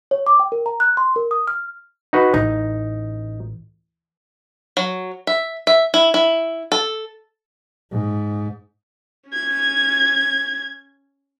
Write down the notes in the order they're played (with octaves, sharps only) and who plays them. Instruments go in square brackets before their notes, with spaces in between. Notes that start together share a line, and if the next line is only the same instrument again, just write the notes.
[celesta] C#5
D6
G5
A#4
A#5
F#6
C6
A#4
D#6
F6
[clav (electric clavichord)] D#4 F#4 B4
[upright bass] A1 [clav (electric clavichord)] D#4
[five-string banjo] F#3
E5
E5
E4
E4
A4
[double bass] G#2
[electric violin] C#4 G#6